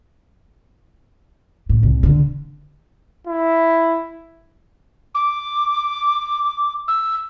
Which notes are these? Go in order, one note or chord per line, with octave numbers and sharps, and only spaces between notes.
A2
C2
D3
E4
D6
E6